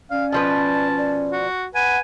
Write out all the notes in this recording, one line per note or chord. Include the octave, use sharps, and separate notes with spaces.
C#4 D5 F5
B2 F3 B4 A5
D5
F#4
B4 F#5 G#5